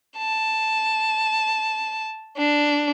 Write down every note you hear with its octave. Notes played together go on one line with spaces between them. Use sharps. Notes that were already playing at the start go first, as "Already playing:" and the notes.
A5
D4